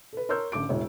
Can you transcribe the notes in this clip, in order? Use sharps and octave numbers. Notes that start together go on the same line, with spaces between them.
A4 B4
A#4 C#5 C6 E6 F6 G6
A1 D3 D6 D7
E1 A2 C#5